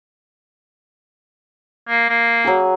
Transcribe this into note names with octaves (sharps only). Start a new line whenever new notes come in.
A#3
A#3
F#3 G#4